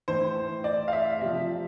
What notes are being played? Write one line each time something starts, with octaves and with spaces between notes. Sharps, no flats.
A2 E3 C5
D5
F5
E5
C3 F3 E5